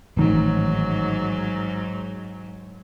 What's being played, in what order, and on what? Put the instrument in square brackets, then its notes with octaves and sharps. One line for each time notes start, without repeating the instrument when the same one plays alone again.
[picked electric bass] A1 D#3 [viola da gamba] G#2 F#3